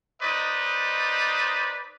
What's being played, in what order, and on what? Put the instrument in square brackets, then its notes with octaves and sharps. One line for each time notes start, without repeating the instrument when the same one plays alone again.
[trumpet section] D#4 B4 C5 D5 D#5